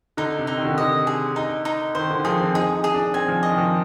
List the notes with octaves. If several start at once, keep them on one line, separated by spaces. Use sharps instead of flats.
D3 D#4
C3
D#4
D#3
D3
C3
D3 D#5
G#4
D#4
D#4
D#3 C5
D3
D#3
F3 G#4
C4
D#4 G#4
D#4
G#4
D4
C4 G#5
F3
D#5
D#3
F3